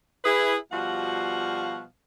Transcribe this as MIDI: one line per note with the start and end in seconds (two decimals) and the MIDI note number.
0.24 0.56 64
0.24 0.56 68
0.24 0.56 71
0.72 1.83 47
0.72 1.83 53
0.72 1.83 55
0.72 1.83 66
0.72 1.83 77
0.72 1.83 78